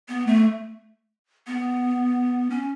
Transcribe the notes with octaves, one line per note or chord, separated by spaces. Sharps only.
B3
A3
B3
C#4